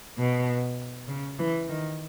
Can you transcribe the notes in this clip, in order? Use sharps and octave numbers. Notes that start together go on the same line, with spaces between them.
B2
C#3
E3
D#3